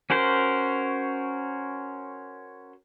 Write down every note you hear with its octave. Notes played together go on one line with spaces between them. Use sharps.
C#4 F#4 A#4 C5